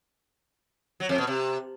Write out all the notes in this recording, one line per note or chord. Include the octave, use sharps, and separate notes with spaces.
F#3
F2
B2
C3